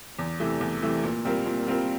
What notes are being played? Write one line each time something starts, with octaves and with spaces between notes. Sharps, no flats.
E2
C3 E3 A3
E2
C3 E3 A3
A#2
G3 C4 F4 A#4
A#2
G3 C4 F4 A#4